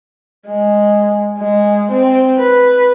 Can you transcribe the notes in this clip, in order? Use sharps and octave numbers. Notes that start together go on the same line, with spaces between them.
G#3
G#3
C4
B4